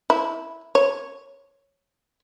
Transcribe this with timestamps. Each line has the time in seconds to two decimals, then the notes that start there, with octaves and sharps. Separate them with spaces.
0.10 E4
0.75 C#5